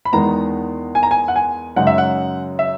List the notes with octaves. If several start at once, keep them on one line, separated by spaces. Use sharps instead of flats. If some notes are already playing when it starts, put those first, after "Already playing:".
B5
E2 D#3 G#3 B3 A#5
G#5
A#5
G#5
F#5
G#5
F#2 C#3 G#3 D#4 F#5
E5
F#5
E5